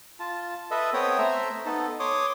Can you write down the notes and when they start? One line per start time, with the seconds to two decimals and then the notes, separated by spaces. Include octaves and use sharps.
0.20 F4 A5
0.71 A4 B4 D#5 E5
0.94 B3 C4 C#5 G5 D#6
1.18 A3 C5 E5 A#5
1.66 B3 D#4 A4
2.00 C#5 C6 D6 D#6